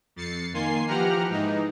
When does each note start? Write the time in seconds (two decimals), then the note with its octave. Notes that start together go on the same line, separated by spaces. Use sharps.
0.16 F2 A6 C7 C#7
0.53 D#3 A#3 G#5 C6 C7
0.87 E3 F3 G4 F#5 A#5 F6
1.30 G#2 E3 D#4